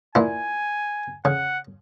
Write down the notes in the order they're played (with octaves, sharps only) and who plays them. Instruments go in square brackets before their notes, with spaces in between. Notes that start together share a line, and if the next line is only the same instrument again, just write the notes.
[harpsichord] A#2 E4 [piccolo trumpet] G#5
[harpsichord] C#3 [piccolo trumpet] F#5